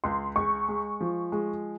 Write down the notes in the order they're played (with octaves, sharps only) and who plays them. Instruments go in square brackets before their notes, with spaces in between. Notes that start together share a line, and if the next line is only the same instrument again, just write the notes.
[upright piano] C#2 [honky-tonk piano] C6
[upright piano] G#3 [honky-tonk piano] C#6
[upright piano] G#3
F3
G#3